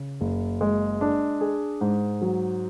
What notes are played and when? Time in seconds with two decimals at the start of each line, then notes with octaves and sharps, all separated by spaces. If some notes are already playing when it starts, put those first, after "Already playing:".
Already playing: C#3
0.21 F#1
0.61 G#3
1.01 D4
1.41 G#4
1.81 G#2
2.21 F#3